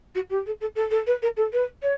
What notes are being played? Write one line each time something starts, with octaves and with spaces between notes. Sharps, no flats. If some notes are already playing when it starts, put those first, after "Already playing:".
F#4
G4
A4
A4
A4
A4
B4
A#4
A4
B4
C#5